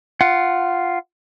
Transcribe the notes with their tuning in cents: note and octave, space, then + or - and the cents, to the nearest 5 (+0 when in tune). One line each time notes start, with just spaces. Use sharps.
F4 +0 F#5 +15